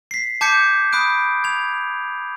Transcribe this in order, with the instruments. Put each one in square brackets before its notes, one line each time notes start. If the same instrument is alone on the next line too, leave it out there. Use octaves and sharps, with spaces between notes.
[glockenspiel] B6 C7
A5 D6 G6 G#6 B6 C#7
B5 D#6 F#6 D7
G#6 F7